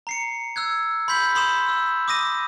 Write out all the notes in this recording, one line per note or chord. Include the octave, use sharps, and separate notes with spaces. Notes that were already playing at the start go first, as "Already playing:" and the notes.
A#5 C7 C#7
E6 F#6 G#6
B5 C6 G6 B6 F#7
B5 C6 D#6 E7
E6
D6 D#6 A#6 D#7